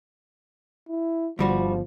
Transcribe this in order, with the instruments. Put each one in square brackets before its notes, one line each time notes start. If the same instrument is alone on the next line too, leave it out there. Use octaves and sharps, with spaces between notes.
[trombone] E4
[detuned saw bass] G1 [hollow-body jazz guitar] D2 G3 F#4 [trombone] F3